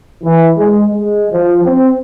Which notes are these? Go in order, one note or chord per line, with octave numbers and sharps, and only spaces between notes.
E3
G#3
G#3
F3
C4